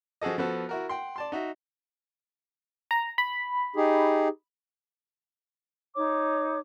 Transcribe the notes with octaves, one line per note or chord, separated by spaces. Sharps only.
F3 F#4 G#4 A4 D#5
F3 B3 F#4 A4
E4 F#4 A#4
F#5 G5 C6
D5 A5 C6
D#4 F#4 E5
A#5
B5
D#4 G4 G#4
D#4 C#5 D6